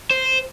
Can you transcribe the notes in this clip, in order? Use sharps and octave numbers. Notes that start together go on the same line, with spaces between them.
C5